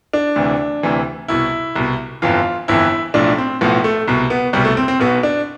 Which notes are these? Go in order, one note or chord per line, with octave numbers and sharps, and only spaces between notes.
D4
D2 C3 E3
D2 C3 E3
C2 B2 E4
C2 B2
G1 F2 E3 F4
G1 F2 E3 E4
B1 A2 F3 D4
C4
B1 A2 F3 B3
A3
C2 B2
B3
C2 B2 G3
A3
C4
C4
B1 B2 B3
D4